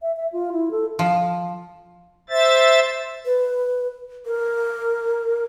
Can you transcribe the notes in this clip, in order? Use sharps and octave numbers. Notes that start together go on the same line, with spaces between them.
E5
E5
F4
E4
A4
F3
C5 E5 A6
B4
A#4